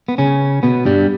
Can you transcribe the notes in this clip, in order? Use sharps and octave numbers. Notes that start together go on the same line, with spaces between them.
B3
C#3 C#4
B2 B3
G2 G3